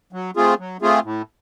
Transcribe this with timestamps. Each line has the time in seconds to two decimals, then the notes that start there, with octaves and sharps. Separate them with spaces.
0.13 F#3
0.36 A3 C4 F4 G#4
0.59 F#3
0.82 A3 C4 F4 G#4
1.04 A2